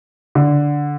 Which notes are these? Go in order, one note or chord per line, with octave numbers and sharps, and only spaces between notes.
D3